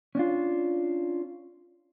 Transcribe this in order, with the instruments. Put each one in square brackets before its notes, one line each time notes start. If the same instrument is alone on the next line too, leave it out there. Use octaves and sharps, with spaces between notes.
[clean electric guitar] C#4 D4 F4